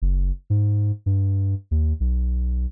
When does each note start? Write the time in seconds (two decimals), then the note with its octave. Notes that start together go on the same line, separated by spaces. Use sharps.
0.02 F#1
0.50 G#2
1.06 G2
1.71 D#2
2.00 B1